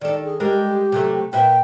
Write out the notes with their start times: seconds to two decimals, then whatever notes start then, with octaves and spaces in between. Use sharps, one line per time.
0.01 D#3 A4 D5
0.24 G#4
0.40 G3 G#3 G4 A#4
0.92 C3 F#3 A3
1.33 A#2 B4 E5 G5